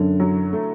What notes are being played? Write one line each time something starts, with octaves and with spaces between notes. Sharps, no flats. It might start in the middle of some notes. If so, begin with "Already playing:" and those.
Already playing: F#2 D3
F#3
A3